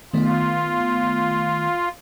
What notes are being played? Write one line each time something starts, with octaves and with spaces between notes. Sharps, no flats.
D#3 A3 B3 F4